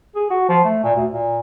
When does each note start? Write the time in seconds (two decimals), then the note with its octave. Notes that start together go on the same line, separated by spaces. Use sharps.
0.15 G#4
0.30 F#4
0.49 F3
0.64 A3
0.84 A#2
0.96 D2
1.13 A#2